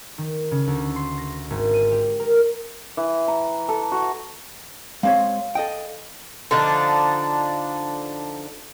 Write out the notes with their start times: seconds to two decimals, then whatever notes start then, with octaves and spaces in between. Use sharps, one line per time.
0.18 D#3
0.51 C#3
0.67 D2
0.96 C6
1.18 A#6
1.50 G#1
1.73 D#7
1.91 G4
2.20 A#4
2.97 E3
3.28 A#5
3.69 A4
3.92 F#4
5.03 G#3 C4 C#5 F5
5.55 A4 D#5 G5
6.51 D3 F3 D4 D#4